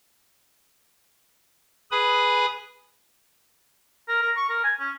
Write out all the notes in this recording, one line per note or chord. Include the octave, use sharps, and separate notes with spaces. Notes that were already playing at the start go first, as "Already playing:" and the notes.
G#4 B4 G#5 B5 D#6
A#4
A#4
C#6
A#4
G#5
C#4